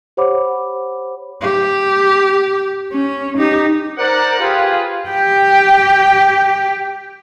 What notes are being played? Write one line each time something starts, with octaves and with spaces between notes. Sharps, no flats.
G4 C5 C#5 F#5 B5 D6
G4
C#4
D#4 G4
A#4 C5 D5 F#5
F4 G4 G#4 B4
G4 G5